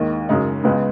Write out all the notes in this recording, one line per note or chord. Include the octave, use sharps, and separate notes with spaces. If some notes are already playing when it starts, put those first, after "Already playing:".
Already playing: D#2 D#3 G#3
F#2 C#3 G#3 D#4
C#2 C#3 G#3 B3